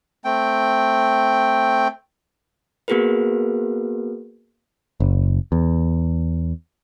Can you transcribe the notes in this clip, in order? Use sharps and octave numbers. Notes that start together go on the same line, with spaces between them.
A3 C4 G5
A#3 B3 F#4 G#4 A#4 B4
F#1
E2